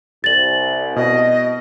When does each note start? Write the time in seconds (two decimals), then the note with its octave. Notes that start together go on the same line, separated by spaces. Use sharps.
0.24 C2 A6 F#7
0.96 B2 D#5